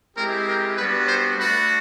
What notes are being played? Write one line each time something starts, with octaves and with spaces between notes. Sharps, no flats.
G#3 C4 E4 G4 A#4
A#4
G3 B3 D4 F#4 B4
C5
A3 D4 F#4 B4